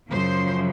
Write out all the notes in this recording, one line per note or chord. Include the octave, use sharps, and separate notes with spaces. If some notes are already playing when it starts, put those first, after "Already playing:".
F#2 C#3 F3 C5